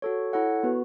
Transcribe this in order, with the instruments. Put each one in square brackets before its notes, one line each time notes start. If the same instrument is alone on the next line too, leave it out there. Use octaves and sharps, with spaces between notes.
[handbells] F#4 A4 C#5
E4 A4 C#5 F#5
B3 F#4 B4